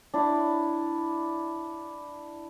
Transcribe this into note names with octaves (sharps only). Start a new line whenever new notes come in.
D4 E4